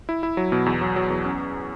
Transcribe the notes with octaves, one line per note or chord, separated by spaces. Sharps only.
E4
E4
F#3
B2
E2
F#3
F#3
E2
C#4